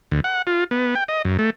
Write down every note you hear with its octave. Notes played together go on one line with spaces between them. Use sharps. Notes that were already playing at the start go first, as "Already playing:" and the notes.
D2
F#5
F4
B3
G5
D#5
F#2
A3